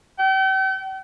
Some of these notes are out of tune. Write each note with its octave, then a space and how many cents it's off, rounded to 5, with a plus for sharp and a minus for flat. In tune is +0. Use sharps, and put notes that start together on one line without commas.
G5 -40